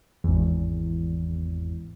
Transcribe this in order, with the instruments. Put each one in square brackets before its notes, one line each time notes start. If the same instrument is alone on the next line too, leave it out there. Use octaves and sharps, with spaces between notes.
[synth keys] G#1 E2